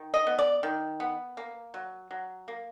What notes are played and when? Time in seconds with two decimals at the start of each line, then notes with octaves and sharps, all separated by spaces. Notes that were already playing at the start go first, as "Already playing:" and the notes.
Already playing: D#3
0.14 D#5
0.27 B3
0.38 D5
0.63 D#3
1.00 B3
1.37 A#3
1.74 F#3
2.11 F#3
2.48 A#3